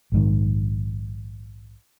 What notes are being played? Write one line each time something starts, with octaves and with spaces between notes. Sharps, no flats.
A#1 G#2 D#3